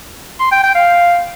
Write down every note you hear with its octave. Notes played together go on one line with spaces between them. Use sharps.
C6
G5
G5
F5